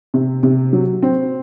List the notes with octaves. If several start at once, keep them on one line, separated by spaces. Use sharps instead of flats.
C3
C3
F#3
C4